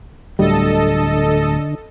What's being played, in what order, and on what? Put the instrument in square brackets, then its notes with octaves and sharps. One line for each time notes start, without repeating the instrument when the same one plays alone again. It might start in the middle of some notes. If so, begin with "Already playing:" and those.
[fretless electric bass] D1 D2 G3 [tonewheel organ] D3 [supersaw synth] A4 D#5